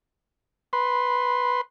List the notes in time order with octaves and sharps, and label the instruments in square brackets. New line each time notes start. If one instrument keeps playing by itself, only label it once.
[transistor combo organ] B4 C6